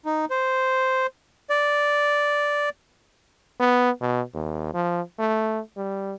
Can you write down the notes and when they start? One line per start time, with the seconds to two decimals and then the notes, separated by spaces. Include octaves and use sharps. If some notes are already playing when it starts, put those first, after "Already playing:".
0.05 D#4
0.30 C5
1.50 D5
3.60 B3
4.01 B2
4.34 D#2
4.74 F3
5.19 A3
5.77 G3